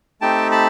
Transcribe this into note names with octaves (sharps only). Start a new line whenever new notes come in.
A3 C4 D#4 G4 G5 A5
A5 B5